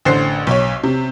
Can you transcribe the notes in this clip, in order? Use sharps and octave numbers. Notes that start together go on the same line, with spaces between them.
A1 D3 C5 C7
B1 C#5
C3